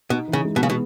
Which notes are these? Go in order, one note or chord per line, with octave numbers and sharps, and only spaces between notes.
B2 D#4
E3
C#3
G#3
B2
C#3 B3
B2